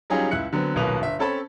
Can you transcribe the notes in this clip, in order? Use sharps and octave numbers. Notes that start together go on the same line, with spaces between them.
F#3 G3 C#4 D#4 F4 G#4
C#2 E4 F#6 C#7
D3 F#3 B3 C4
D#1 B1 B2 A#3 B4 F7
G1 E5
C4 C#4 A4 C#5 A5 B5